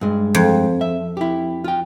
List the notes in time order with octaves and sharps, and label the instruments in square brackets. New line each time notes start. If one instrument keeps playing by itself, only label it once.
[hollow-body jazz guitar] G2 G#3
[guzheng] F2
[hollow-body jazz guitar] E5
E4 G4
F4 G5